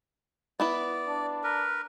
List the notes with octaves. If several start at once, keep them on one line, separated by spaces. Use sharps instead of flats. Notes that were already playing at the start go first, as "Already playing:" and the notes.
B3 E4 B4 D5
D4
A#4 B4